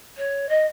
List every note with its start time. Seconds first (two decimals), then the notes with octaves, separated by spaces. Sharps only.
0.17 C#5
0.49 D#5